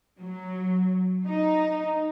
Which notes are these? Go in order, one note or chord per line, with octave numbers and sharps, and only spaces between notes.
F#3
D#4